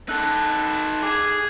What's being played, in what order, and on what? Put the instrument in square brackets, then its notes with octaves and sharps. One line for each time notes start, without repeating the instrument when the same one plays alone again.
[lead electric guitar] D#4 A4 [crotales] E6 F#6
[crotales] F#6
[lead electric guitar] G#4 [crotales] D6 G#6